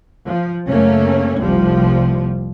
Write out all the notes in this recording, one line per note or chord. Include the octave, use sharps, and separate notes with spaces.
F3
F#2 C#3 A3 A#3 C#4
F1 C2 C3 F3 G3